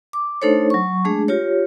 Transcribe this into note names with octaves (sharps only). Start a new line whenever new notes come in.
D6
A3 D4 D#4 A4 C5 C#5
F#3 C#6
G#3 A3 D4 G#4
F4 G4 C#5